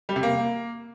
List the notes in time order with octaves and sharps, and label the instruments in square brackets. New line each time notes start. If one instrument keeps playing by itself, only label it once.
[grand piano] G3
C3
A#3